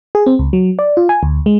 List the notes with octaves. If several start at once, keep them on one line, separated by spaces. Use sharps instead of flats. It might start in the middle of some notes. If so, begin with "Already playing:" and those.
G#4
C4
C#2
F#3
D5
F4
G#5
D2
G#3